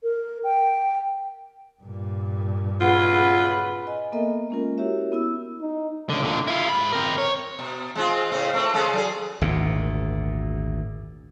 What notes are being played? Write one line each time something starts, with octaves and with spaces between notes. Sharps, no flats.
A#4
G5
G2 A#2
B1 C#3 F4 G#4 B4 F#5
D#5 G#5
A#3 B3 A4 A#4 D#5 E5
G#3 A#3 C#4 F4 A#4
E4 F#4 G4 A#4 C#5 E5
B3 E4 E6
D#4
C#2 D3
A#2 D3
E4 F4
G#2 B5
C4 A#4
C#5
B2
G#3 C4 F4
A2 C#3 C4
A3 C4 B4
C#3 G#3 A4
F#3 G#4
G#1 D2 A#2